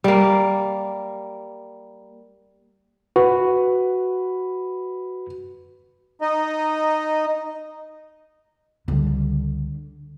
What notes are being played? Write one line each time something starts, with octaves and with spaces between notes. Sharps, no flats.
G3 A#3
F#4 B4
D#4 D#5
C#2 D3 G3